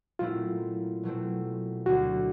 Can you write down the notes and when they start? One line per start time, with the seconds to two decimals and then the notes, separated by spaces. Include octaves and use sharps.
0.19 A#2 F#3 A3 C4 E4 F4
1.03 B2 F#3 A3 C4
1.86 D2 D3 F#3 F#4